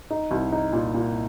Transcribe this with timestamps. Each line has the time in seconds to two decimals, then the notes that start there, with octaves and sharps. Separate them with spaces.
0.10 D#4
0.31 C2
0.52 D#4
0.73 A#2
0.94 A#2